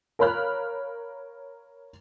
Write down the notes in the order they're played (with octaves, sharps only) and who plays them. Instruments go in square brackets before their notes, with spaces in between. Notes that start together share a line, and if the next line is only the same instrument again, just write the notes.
[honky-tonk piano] A#4 C#5 F5 B5 F6 F#6